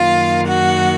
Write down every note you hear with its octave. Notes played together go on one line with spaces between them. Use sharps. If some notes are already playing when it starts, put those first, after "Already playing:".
Already playing: F#2 D#3 A#3 F4 F5
F#4 F#5